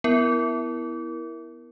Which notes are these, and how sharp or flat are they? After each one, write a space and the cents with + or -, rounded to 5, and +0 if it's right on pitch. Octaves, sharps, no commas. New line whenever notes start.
B3 +5 E4 +0 A#4 +10